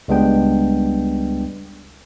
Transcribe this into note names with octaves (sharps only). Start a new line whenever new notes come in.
C#2 G3 G#3 B3 D4 G5